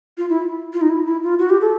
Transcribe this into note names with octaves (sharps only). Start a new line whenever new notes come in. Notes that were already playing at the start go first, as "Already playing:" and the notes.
F4
E4
F4
D#4
E4
E4
F4
F#4
G4
A4